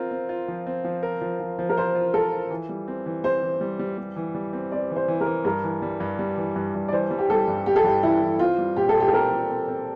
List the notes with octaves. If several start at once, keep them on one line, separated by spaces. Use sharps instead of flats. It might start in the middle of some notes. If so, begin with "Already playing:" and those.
Already playing: C4 F4 A#4
C4
F4
F3
C4
F3
A#4
F3
F3
F3
A#4
F4 C5
F4
A4 A#4
F4
E3
G3
C4
E3
C4 C5
E3
G3
G3
G3
E3
G3
C4
C4 D5
E3
C5
E3
A#4
E3
G2 A#4
E3
G3
G2
G3
E3
G2
G2
D5
E3 C5
G3
G4
G3 A4
G2
G3 G4
A4
G2 G4
E3 E4
E3
C4 F4
G3
A#2 G4
A4
A#2
G4
A4
C4 A#4
A#2
C4
C4